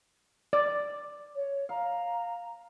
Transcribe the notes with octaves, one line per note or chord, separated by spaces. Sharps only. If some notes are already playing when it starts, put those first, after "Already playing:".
D5
C#5
F5 A#5